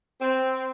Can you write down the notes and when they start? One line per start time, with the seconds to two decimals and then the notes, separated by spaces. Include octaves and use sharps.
0.21 C4